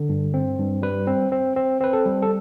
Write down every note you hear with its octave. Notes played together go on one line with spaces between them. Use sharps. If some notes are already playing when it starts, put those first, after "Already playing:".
Already playing: D3
G2
C4
G2
G3 B4
C4
C4
C4
C4 B4
A4
G3
A4